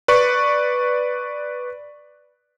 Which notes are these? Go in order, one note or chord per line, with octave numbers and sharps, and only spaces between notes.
B4 D5 C#6